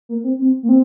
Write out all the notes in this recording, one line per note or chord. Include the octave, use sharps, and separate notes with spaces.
A#3
C4
C4
A#3
C4